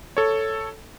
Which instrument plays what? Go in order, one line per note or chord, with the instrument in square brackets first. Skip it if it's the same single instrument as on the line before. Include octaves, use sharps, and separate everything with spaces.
[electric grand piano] A4 C#5